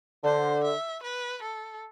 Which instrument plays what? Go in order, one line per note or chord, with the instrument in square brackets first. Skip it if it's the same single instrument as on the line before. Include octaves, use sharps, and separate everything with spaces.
[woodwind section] D3 [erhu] C5
[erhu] E5
B4
A4